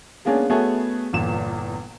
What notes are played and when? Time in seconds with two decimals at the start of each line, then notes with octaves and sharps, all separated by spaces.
0.25 G#3 A#3 B3 C#4 D4 G#4
0.50 A3 B3 F#4 G#4 A4 C#5
1.13 G1 E2 A#2 E7